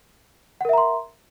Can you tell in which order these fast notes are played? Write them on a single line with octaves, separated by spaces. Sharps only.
F#5 A#4 E5 A#5 C6